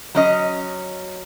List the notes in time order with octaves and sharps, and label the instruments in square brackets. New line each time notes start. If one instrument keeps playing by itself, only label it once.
[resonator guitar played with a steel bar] F#3 C#4 D#5